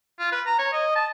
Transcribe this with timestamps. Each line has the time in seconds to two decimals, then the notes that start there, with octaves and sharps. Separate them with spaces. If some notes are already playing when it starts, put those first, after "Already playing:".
0.20 F4
0.32 B4
0.46 A#5
0.59 C#5
0.73 D#5
0.96 A5